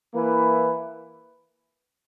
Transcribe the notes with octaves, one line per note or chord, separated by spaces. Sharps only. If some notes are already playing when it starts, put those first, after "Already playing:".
E3 A#3 E4 B4